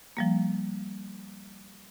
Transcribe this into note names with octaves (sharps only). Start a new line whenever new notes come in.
F3 G3 A#3